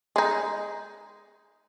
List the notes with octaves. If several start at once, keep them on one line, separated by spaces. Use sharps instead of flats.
G#3 D#4